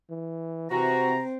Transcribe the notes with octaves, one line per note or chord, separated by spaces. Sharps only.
E3
C3 E3 C4 F#4 A#5